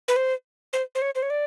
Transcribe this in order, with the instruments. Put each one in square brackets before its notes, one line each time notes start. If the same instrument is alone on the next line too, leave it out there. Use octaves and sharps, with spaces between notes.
[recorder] B4
C5
C5
C5
C#5
C5
C#5
D5